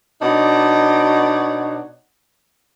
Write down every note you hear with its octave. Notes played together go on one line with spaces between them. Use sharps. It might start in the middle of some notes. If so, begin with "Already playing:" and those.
B2 D4 D#4 C#5 D5 F#5